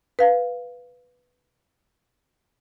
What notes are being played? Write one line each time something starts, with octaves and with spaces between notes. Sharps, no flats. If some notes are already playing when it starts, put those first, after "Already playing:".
B4 F5